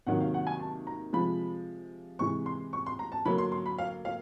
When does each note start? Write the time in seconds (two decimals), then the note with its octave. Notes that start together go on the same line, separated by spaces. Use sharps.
0.06 C3 D#3 F#3 A#3 F#5
0.21 F5
0.34 F#5
0.47 G#5
0.60 A5
0.87 A#5
1.13 C3 F3 G#3 B5
2.19 C3 E3 G#3 C#6
2.46 C6
2.73 C#6
2.86 C6
2.99 A#5
3.12 A5
3.25 D3 F#3 A#3 B5
3.38 C6
3.52 C6
3.66 B5
3.78 F5
4.05 F5